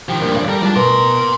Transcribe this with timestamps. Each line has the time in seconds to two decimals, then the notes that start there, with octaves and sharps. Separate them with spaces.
0.09 D#3 F3 G4
0.21 G2 A#2 F3
0.34 D3 C#5 D5 F5
0.48 G3 A4 A#4
0.62 G3 F4 G#4 D5 A5
0.76 B2 A#4 A#5 C6